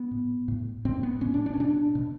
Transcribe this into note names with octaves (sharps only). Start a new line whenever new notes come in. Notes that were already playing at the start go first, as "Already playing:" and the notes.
Already playing: B3
A2
A2
A2 C4
B3
A2 C#4
D4
D4
C#4
B2 D4
B2